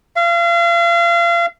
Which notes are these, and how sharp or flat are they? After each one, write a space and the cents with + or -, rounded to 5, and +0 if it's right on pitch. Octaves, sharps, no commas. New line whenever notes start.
F5 -35